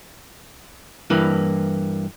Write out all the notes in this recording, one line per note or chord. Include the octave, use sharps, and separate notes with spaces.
G2 E3 A#3